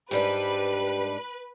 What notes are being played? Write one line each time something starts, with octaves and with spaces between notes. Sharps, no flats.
G#2 G3 D4 G4 B4